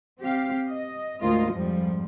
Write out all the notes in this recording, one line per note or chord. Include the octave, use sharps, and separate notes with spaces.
C4 G4 F5
D#5
D2 G#2 A#3 F4 D#5
F2 G#2 F3 G3